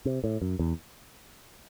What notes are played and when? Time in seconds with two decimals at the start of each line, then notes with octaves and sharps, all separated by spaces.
0.05 C3
0.24 A2
0.42 F#2
0.59 E2